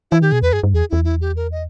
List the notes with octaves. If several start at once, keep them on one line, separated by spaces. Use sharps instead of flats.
E3 E4
D#3 G4
B2 G#4
E2 B4
G2 G#4
G2
E2 G#4
E2 E4
E4
G4
A#4
D#5